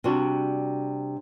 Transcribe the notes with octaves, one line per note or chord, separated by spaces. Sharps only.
C3 G3 D4 F#4